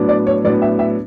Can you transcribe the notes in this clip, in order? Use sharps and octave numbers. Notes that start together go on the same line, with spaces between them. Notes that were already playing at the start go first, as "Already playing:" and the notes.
Already playing: A2 F#3 B3 D4
D5
C#5
A2 F#3 B3 D4 D5
E5
E5